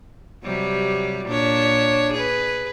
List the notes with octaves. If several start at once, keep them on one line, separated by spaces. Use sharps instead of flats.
C3 F#3 G3
A#2 D4 C#5
G#4 B4